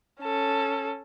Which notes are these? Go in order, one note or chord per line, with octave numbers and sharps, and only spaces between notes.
C#4 A4